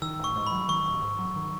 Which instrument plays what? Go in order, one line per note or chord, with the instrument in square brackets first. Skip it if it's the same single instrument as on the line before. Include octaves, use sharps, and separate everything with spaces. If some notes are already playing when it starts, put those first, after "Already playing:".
[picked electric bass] D#3 [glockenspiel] E6
[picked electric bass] A1 [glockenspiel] C#6
[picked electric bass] G#2
[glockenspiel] B5
[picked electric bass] F#3
[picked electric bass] D#3 [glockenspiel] C#6
[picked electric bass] A1
G#2
F#3
D#3